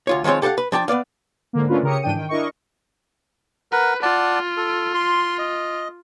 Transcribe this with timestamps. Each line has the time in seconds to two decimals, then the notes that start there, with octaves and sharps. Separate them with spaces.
0.07 D2 F4 C#5
0.24 D#3 F3 G#3 C4 C#5
0.42 G4 A4 B4 F5 F#5
0.58 B4
0.72 F3 D4 G5 A5
0.88 B3 B4 D5 F5
1.53 G#2 D3 A#3
1.68 A3 C#4 D4 F4 A#4 B4
1.83 C#3 G4 A#4 C#5 D#6 C#7
2.02 G#2 E3 D4 G5 D#7
2.15 D#3 G5
2.28 D4 E4 A#4 D#5 C#6
3.72 A#4 B4 F#5
4.02 F4 D5 F#5 A5
4.57 A4
4.94 C6
5.38 D#5